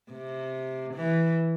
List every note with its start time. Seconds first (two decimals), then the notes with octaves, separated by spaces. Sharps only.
0.12 C3
0.94 E3